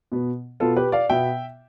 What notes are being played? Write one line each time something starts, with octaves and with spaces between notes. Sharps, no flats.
B2 B3
B2 B3 F4 A4
G4 B4
D5 F5
B2 B3 E5 G5